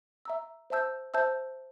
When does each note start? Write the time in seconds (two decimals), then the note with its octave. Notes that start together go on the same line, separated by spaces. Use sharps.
0.25 E5 A#5 E6
0.70 C5 E5 A5 E6 G6
1.14 C5 E5 A5 E6 G6